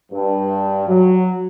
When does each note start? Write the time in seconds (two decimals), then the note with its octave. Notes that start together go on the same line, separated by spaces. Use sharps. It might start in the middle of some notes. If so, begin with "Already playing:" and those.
0.12 G2
0.88 F#3